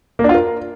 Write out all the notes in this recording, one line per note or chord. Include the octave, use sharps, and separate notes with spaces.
A#3
D4
F4
A#4